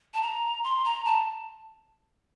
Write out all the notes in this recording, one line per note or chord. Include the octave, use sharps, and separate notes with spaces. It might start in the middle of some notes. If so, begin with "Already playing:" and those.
A5
A#5
C6
A#5
A5